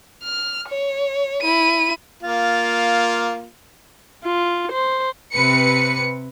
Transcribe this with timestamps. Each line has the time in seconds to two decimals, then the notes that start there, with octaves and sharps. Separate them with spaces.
0.24 F6
0.68 C#5
1.42 E4 D#7
2.23 A#3 F4
4.25 F4
4.72 C5
5.34 C3 B4 C#7